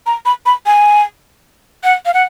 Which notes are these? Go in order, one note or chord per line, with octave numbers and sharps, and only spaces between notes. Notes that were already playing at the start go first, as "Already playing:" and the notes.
A#5
B5
B5
G#5
F#5
F5
F#5